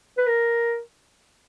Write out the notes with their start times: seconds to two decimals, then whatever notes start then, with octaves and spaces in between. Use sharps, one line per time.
0.18 B4
0.27 A#4